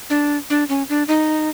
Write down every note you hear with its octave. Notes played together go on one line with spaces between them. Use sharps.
D4
D4
C#4
D4
D#4